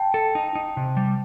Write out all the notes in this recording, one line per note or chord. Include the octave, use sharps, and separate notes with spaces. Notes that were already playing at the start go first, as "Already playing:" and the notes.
Already playing: G5 A5
A4
D#4
D#4
C3
G3